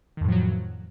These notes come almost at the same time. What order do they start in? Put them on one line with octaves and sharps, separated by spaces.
D#3 F2 A2 F3 F#3